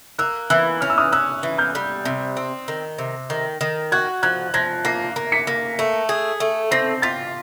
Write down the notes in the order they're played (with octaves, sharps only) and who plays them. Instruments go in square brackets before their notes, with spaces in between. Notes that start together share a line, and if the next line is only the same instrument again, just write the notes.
[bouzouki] A#3 [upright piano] E6 F#6
[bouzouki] E3 [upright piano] E6 F#6
[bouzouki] C#4 [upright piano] F6
[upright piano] E6
D#6 F6
[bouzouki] C#4 [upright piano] E6 F#6
[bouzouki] E3
[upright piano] F6 G6
[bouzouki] G3
C3
C4
D#3
C3
D#3
D#3
[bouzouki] F#4 [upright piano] F#6 G#6
[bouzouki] F3 [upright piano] F#6 G#6
[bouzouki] F3 [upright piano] G#6 A#6
[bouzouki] A#3 [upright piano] A#6 C7
[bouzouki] A#3
[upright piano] B6 C#7
[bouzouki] A#3
A3
G#4
A3
[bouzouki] C4 [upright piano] A#6 C7
[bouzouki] F4 [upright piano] A6 B6